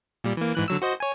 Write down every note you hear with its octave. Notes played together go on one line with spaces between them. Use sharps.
A#2 G3
E3 A#3
G#2 E3 F#6
D3 F#3 E6
F#4 C5 D#5
C#5 G#5